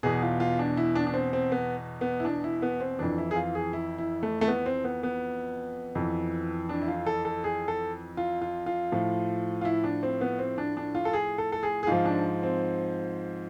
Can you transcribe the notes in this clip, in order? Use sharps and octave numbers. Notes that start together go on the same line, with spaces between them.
E2 B2 G#4
F4
F4
D4
E4
D4
D4
C4
C4
B3
B3
E4
D4
E4
B3
C4
F2 E3 D4
E4
G#4
F4
G#4
E4
E4
A3
A3
B3
C4
B3
B3
F2 E3
D4
E4
F4
A4
A4
G#4
A4
F4
F4
F4
A2 F3
F4
E4
D4
C4
B3
C4
D4
D4
F4
A4
G#4
A4
A4
G#4
G#4
G#2 F3 F4
D4
C4